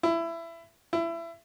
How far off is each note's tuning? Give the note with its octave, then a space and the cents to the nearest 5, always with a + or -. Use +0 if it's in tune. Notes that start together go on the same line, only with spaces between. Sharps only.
E4 +20
E4 +25